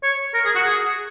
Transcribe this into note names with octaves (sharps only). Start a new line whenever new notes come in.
C#5
A#4
G#4
F#4
G#4